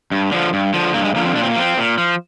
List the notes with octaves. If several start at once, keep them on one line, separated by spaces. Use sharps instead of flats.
G2
D3 F3
G2
D3 F3
G2 A#3
G#3
D3 F3 A#3
C4
A#2 D4
C4
A#3
F3 C4
A#2
F3